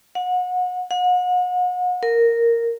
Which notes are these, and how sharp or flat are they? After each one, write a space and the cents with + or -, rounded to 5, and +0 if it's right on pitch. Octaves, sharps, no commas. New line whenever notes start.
F#5 -30
F#5 -40
A#4 -5